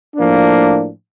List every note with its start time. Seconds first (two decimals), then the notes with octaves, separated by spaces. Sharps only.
0.16 A2 F3 A#3 D4